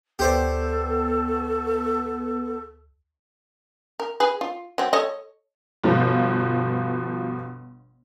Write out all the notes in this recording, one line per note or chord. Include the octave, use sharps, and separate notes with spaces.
D2 B3 G4 A4 C5 D5
A#4
G#4 B4
F4
F#3 C4
A4 C#5 D#5
G1 B2 F3